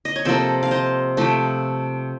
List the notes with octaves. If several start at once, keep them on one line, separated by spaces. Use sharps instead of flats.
D#5
C#5
C3 F3 A#3 A4 C5
F5
C5 D#5
C3 F3 A3